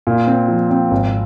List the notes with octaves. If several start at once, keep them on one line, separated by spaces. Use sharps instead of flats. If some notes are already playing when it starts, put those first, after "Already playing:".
A#2
C4
F3
C4
G#1